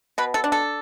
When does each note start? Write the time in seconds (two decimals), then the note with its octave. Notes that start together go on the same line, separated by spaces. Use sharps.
0.18 B2 B4
0.34 A4
0.44 D4
0.52 A4